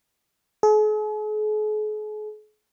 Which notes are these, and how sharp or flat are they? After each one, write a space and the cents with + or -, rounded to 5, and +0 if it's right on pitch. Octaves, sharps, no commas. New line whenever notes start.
G#4 +45